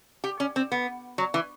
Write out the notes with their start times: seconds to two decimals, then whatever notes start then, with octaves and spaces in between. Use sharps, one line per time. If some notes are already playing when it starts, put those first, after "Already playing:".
0.24 G4
0.40 C#4
0.56 C4
0.72 B3
1.18 F#3
1.34 E3